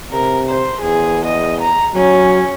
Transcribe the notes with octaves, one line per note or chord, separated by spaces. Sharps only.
C3 A#4
C5
E2 G#4
D#5
A#5
F#3 C#4